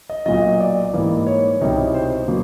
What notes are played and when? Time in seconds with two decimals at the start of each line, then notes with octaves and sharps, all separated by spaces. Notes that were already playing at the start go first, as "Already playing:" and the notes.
0.10 D#5
0.26 B1 A#2 F#3 D#5
0.60 D5
0.93 G#2 E3 G3 A#3 D#4
1.27 C#5
1.61 C2 B2 G3 C4 D#4
1.94 C5
2.28 B2 F#3 A#3